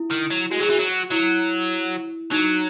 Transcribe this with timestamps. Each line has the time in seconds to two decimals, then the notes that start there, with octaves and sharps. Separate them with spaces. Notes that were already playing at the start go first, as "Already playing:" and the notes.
Already playing: E4
0.11 D#3
0.31 F#3
0.51 G#3 F#4
0.60 F#3 G#4
0.70 E3 F#4
0.79 F#3
1.11 F#3 E4
2.31 F#3 D#4